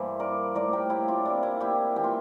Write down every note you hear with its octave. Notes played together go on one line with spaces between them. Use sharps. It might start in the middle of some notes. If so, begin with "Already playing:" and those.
Already playing: G2 E3 A#3 C5 E5
A#4 D5
A2 F3 A#3 A#4 D5
G4 A#4
E4 G4
D4 F4
C3 G3 A#3 D4
E4
E4 G4
E3 A#3 G4
F4